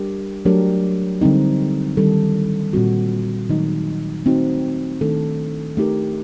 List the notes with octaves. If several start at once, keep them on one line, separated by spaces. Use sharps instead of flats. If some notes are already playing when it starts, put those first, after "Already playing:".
Already playing: G3 D4 G4 A#4
F#3 A3 D4 G4 A#4
D3 G3 C4 D#4
D#3 G3 D4 A4
A#2 G3 C4 F#4
D#3 F#3 A3 D#4
D#3 A3 C4 D#4 F#4
D#3 A3 D4 A4
A3 D#4 G4 A#4